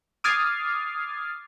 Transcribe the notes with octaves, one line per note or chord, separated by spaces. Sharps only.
D6 D#6 F6 G#6 A6 C7